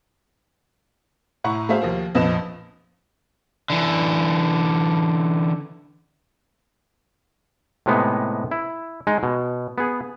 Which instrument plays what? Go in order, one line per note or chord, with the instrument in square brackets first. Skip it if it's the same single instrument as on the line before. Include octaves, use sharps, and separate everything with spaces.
[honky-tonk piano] A2 E4 F#5 A#5 C#6
A3 F#4 G#4 C5 E5 F5
D#2 F3 A#4 C5
A#1 F2 F3 B4 D#5 E7
[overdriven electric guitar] D3 E3
[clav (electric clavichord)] A2 C3 G#3 B3 D#4
E4
G#3 D#4
B2
B3 G#4